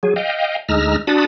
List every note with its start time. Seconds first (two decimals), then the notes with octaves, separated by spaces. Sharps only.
0.03 F#3 G#4
0.16 D#5 F5 G5
0.69 D2 G#3 D#4 A#5 E6 F6
1.07 D4 F#4 A5 B5 D#6